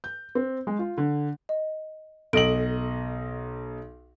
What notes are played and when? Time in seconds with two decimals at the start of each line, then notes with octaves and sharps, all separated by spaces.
0.04 G6
0.35 C4
0.67 G#3
0.79 F4
0.98 D3
1.49 D#5
2.33 B1 A4 D#5 D7 F#7